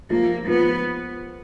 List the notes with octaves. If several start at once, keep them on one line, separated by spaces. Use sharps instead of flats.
F3 A#3
F3 B3